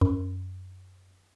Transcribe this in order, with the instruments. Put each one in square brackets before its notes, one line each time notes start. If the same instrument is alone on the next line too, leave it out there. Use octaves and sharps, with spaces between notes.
[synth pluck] F#2